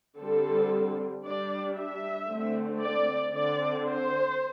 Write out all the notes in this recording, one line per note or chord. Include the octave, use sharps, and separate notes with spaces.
D3 G3 C4 A4
G3 D4 D5
E5
D3 A3 C4
D5
D3 C4 D5
C5